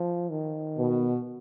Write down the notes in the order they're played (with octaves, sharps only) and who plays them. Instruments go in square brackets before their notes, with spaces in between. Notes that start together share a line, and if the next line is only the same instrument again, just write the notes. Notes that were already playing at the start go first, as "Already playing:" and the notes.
Already playing: [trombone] F3
D#3
[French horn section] B2